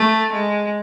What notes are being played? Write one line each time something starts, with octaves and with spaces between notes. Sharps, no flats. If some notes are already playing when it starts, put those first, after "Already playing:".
Already playing: A3
G#3